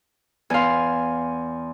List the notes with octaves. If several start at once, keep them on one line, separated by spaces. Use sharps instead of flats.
E2 F5 G#5 C6